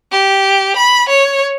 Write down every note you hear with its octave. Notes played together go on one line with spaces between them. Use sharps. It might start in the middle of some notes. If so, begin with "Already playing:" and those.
G4
B5
C#5